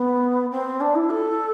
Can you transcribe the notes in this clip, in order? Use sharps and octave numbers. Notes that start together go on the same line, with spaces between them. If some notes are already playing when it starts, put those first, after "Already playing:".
Already playing: B3
C4
D4
E4
A4